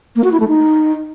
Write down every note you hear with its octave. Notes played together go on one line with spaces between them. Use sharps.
A#3
F#4
E4
A3
D#4